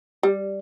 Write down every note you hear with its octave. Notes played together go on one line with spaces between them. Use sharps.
G3